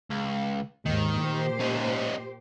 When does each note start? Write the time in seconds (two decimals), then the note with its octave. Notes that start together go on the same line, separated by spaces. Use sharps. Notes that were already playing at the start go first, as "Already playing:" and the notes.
0.11 C#2
0.86 D#2 G#2 D#3
1.20 A#2 G4 C5
1.60 C#4 D#4